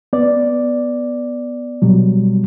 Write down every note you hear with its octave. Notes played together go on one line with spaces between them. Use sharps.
B3 D5
B2 F#3 G3